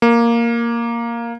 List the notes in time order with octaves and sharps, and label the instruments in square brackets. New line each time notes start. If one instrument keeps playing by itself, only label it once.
[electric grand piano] A#3